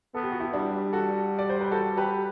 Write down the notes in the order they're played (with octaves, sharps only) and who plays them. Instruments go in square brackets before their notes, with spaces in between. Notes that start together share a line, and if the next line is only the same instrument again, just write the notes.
[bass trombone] B3 [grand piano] A4
[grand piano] G4
F#4
E4 G4
[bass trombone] G3 [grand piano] D4
[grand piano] F#4 A4
D5
C5
B4
F#4 A4
G4 B4